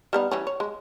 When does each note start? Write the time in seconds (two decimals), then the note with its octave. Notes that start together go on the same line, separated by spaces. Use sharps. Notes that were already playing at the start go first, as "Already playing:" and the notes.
0.13 G3 B3 D#4
0.31 E3 G3 C#4
0.47 C#5
0.60 G#3